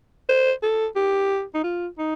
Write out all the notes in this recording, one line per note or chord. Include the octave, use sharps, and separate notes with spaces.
C5
A4
G4
D#4
F4
D#4